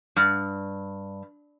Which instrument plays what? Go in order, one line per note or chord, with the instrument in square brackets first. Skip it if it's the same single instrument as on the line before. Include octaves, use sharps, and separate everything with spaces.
[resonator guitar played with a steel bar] G2